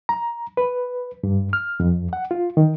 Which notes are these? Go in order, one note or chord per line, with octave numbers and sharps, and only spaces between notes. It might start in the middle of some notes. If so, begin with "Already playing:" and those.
A#5
B4
G2
F6
F2
F#5
F4
D#3